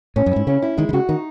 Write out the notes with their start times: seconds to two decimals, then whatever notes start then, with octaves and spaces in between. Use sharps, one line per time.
0.16 A2 C#4
0.26 F#2
0.32 G#2 E4
0.47 C#3 C#4
0.62 E4
0.77 D#3 G#3
0.89 D#3
0.93 C#3 F#4
1.09 D#3 D#4